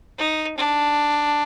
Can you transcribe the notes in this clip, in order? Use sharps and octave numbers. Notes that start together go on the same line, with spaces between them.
D#4
D4